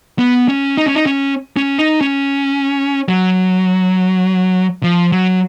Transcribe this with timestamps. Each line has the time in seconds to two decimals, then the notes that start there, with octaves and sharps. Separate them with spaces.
0.19 B3
0.49 C#4
0.77 D#4
0.86 C#4
0.95 D#4
1.06 C#4
1.56 C#4
1.79 D#4
2.01 C#4
3.09 F#3
4.83 F3
5.12 F#3